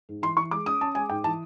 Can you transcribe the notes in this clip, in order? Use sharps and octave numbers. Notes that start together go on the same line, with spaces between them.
G#2
E3 C6
E3 C#6
G#3 D6
C#4 D#6
C#4 A5
G#3 G#5
G#2 G5
E3 A5